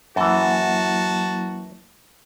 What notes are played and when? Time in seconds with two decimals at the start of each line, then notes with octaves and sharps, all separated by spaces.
0.16 F#2 E3 F#3 A#3 E4 F#4 A5